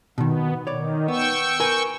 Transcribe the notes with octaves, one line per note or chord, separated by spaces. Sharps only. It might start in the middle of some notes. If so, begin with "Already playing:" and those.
B2 D#3 B3
D#3 C#5 D5
B3 G5 C#6 E6
A#4 B4 G#5